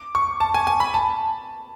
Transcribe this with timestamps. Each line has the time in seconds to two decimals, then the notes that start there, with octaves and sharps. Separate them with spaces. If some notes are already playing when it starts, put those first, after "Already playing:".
Already playing: D6
0.15 C#6
0.40 A5
0.54 G#5
0.67 G#5
0.80 B5
0.94 A5